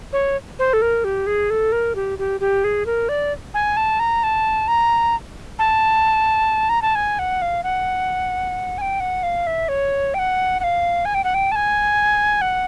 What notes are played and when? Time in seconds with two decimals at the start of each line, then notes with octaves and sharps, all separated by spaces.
0.13 C#5
0.59 C5
0.73 A4
0.82 A#4
1.04 G4
1.26 G#4
1.50 A4
1.72 A#4
1.95 G4
2.19 G4
2.40 G4
2.64 G#4
2.86 A#4
3.09 D5
3.54 G#5
3.77 A5
3.99 A#5
4.23 A5
4.68 A#5
5.59 A5
6.69 A#5
6.82 A5
6.95 G#5
7.19 F#5
7.42 F5
7.63 F#5
8.78 G#5
8.81 G5
9.00 F#5
9.23 F5
9.47 E5
9.68 C#5
10.14 G5
10.19 F#5
10.60 F#5
10.64 F5
11.05 G#5
11.14 G5
11.24 F#5
11.34 G5
11.51 A5
11.56 G#5
12.41 F#5